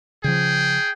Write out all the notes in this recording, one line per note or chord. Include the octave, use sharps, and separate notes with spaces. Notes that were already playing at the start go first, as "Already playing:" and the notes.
C#3 F3 G#4 G5